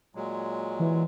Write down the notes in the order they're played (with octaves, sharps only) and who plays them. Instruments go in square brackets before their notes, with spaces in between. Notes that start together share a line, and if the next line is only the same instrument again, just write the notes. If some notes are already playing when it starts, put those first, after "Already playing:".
[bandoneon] A#2 F#3 G#3
[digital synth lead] E3